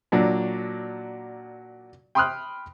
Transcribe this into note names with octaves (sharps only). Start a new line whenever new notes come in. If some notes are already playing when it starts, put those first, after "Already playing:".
A#2 F#3 D4
G5 B5 C6 D#6 F6 F#6